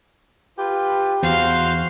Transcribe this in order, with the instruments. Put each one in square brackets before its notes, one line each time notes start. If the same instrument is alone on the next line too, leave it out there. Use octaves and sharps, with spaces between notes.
[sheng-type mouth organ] F4 B4 [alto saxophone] G4
[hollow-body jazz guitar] E2 [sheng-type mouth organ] F#4 C5 G6 [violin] F5